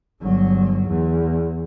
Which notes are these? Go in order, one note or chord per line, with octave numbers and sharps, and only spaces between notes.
G1 F#3
E2